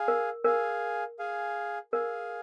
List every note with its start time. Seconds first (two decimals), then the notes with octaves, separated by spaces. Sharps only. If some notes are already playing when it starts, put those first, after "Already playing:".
Already playing: G#4 F5 G#5
0.08 A#4
0.45 G#4 A#4 F5 G#5
1.19 G#4 F5 G#5
1.93 G#4 A#4 F5 G#5